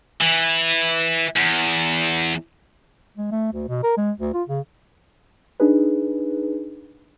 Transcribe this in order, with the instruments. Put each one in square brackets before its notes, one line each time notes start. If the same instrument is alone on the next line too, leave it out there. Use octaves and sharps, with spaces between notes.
[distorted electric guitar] E3
E2
[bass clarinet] G#3
A3
D2
B2
A#4
G#3
D2
F4
C#3
[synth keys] D4 D#4 G#4 B4